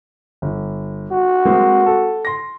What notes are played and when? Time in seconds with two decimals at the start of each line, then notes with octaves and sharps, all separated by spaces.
0.42 G1
1.12 F#4
1.45 G#3 A#3 C4
1.86 A4
2.25 C6 A#6